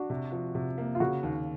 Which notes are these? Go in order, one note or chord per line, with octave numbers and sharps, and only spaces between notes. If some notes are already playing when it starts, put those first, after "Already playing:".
Already playing: D4 F#4
C3
F3
C3
A#3
F4
C#3 F#4
D#2